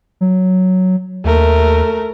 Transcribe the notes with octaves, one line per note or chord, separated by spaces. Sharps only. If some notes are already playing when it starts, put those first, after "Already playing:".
F#3
D#2 A3 A#4